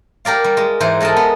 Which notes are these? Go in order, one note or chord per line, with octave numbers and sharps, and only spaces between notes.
G4 A#4 D5 F5
G3
G#3
G#2 E3 C5
G#3 A4 A#4 D#5 A5
B3